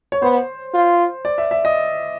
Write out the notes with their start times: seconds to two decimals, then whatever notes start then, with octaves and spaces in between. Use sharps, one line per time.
0.12 C#5
0.22 B3 C5
0.74 F4
1.25 D5
1.38 E5
1.51 E5
1.65 D#5